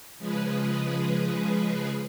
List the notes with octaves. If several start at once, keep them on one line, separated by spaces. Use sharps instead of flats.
C#3 F3 G#3 G#4 B4